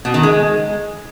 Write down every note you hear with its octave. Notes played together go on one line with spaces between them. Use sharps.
B2
D#3
G#3